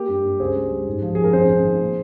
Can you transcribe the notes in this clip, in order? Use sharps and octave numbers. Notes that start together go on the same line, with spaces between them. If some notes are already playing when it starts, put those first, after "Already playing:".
Already playing: A#3 G4 A#4
G2
G2
C#2 G#4 C5
G3
G3
G#2
F3
F3 G#4
A#4
G#1 G#4 C5
G#1
D#3
A#2